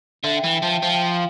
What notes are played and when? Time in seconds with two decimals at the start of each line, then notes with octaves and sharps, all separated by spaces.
0.24 D3 E5
0.37 G5
0.44 E3
0.50 G5
0.63 F3 A5
0.73 G5
0.83 F3 F5
0.94 G5
1.03 F5